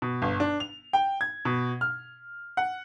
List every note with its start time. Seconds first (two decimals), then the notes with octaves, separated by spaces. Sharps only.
0.02 B2
0.22 G1
0.40 D4
0.60 F7
0.93 G5
1.21 G#6
1.45 B2
1.81 F6
2.57 F#5